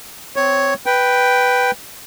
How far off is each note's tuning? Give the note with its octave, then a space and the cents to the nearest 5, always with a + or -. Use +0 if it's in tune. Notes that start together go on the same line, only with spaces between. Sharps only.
C4 -15 C#5 +0
B4 +0 G5 +0